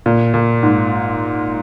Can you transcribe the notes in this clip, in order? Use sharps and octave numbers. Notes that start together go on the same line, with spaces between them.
A#2
A#2
G#2